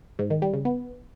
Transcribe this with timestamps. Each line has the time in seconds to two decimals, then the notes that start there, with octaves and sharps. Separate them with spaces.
0.19 G#2
0.30 D#3
0.42 G3
0.54 C#3
0.65 B3